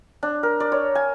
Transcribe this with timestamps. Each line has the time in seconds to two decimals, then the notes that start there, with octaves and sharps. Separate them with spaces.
0.23 D4
0.43 A#4
0.60 D5
0.72 C#5
0.95 G#5